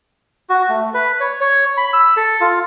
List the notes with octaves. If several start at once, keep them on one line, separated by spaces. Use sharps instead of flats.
F#4
A3
B4
C#5
C#5
B5
E6
A4
F4